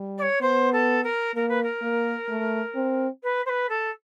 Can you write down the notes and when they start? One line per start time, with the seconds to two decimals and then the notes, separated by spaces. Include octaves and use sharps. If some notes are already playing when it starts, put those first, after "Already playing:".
Already playing: G3
0.17 D5
0.21 C#5
0.41 B3 C5
0.72 A4
1.03 A#4
1.34 A#3 A#4
1.48 B4
1.62 A#4
1.82 A#3
2.29 A3
2.75 C4
3.23 B4
3.45 C5
3.49 B4
3.69 A4